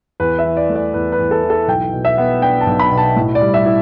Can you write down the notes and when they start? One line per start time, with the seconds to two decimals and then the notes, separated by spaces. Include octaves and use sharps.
0.20 E2 B4
0.39 E5
0.44 E3
0.57 D5
0.69 A3
0.76 D5
0.94 E2 B4
1.12 B4
1.19 E2
1.31 A4
1.43 E3
1.50 A4
1.68 B1 G5
1.93 B2
2.05 E5
2.18 B3
2.42 D4 G5
2.61 A5
2.67 B1
2.79 B5
2.91 B2
2.98 A5
3.16 A2
3.35 D5
3.41 G3
3.54 E5
3.66 E4